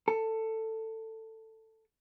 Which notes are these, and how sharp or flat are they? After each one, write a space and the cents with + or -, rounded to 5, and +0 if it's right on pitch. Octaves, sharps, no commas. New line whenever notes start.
A4 +15